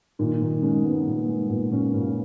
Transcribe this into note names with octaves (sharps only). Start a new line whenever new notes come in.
A#2 D#3 D#4
A#2 D#3 D#4
C#3 G#3 C#4
G#3 B3
A#2
A#3
G#3
A#2 B3
A#2 C#3 C#4
A#2 C#3 C#4